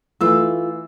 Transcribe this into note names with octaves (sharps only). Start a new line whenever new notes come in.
E3 A3 F4 E6